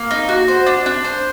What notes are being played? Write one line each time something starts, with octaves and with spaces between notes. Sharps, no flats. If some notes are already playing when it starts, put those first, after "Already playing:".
Already playing: A#3
D#4
F#4
C5
D4
D4
C5